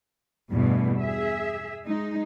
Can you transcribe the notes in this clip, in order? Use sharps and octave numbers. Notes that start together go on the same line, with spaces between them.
E2 G2 B2 A3
G#4 E5
G#3 D#4